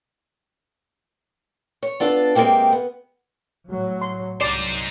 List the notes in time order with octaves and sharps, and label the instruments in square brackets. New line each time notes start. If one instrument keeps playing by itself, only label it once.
[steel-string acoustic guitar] C#5
B3 D4 F4 A4
C3 G#3 A#3 C4 G4
B3
[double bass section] A2 F#3
[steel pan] C6
[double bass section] C2 F#3 [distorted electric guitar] D#4 C5 [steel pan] D5